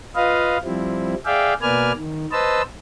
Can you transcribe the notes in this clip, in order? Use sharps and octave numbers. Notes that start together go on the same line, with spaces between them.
F4 B4 D#5 F5
F3 G3 C4 E4
G#4 D5 E5 F5 G5
B2 A#3 B4 D5 G#5 F6
D#3
B4 C5 D#5 A5 E6